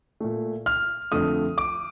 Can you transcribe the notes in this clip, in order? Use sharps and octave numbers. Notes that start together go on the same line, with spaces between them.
A#2 A3
F6
F2 D3 F3 A3 D#6
D6